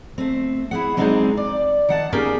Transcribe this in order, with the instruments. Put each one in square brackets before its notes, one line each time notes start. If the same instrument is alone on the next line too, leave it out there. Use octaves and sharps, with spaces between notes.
[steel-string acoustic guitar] A3 C4
E4 G#4 F#5
F#3 G#3 C4 D4 D#4 G#4
D5
D#3 F#5 A5
A#3 C#4 D#4 G4 G#4 A#4